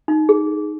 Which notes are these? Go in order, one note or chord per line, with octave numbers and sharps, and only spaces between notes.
D#4
G#4